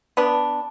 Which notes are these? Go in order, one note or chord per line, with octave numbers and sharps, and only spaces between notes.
B3 D4